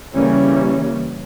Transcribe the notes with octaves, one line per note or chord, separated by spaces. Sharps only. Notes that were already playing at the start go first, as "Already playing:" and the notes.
C#3 E3 G3 A#3 C#4